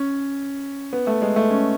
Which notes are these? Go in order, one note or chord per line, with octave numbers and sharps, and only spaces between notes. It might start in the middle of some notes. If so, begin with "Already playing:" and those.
Already playing: C#4
B3
A3
G#3
A3
C#4